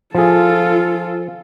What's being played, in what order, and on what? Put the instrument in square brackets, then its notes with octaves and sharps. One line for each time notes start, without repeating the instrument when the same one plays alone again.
[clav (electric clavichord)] F3 G#4 [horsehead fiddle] F4 A4